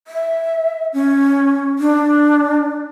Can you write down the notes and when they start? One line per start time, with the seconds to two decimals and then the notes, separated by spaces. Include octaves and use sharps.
0.08 E5
0.93 C#4
1.79 D4